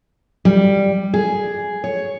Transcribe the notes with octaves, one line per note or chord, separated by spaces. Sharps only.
G3
G#4
C#5